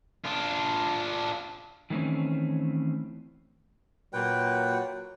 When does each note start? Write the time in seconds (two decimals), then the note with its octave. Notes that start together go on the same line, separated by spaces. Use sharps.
0.24 D4 F4
1.90 D#3 E3 A3 C4 C#4
4.13 A#2 F#3 B4 G5